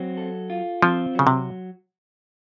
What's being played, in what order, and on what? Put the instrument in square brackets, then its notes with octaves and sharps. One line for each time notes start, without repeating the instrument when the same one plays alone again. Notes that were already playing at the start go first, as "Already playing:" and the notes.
Already playing: [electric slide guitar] F#3 C4
A4
F4
[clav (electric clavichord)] F3 [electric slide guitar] C4
[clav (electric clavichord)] C#3 [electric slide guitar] F#3
[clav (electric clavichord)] C3